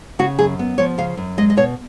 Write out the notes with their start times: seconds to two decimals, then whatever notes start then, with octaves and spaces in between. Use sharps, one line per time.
0.19 C#3 F#4
0.39 F#2 G#4
0.59 B3
0.78 F3 C#5
0.98 C#3 F5
1.17 F#2
1.38 G#3 D#5
1.50 D#5
1.57 B2 C#5